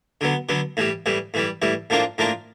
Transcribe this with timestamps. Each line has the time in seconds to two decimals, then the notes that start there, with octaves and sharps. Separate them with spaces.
0.21 D3 F#3 B3
0.49 D3 F#3 B3
0.77 A2 E3 G3
1.06 A2 E3 G3
1.34 A2 E3 G3
1.62 A2 E3 G3
1.90 A2 F3 A#3 D4 F4
2.18 A2 F3 A#3 D4 F4